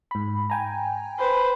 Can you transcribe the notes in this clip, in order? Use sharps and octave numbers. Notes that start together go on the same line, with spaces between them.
G#2 B5
G5 G#5 A#5
B4 C5